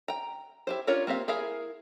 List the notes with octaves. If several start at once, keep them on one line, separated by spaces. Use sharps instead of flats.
G5 A#5
E4 G4 C5
C#4 D4 F4 A#4 C#5
A#3 C4 G4 F5
E4 G#4 A#4 F5